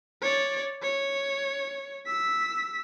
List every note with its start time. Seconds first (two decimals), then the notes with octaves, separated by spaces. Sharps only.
0.22 C#5 D5
0.82 C#5
2.06 E6 B6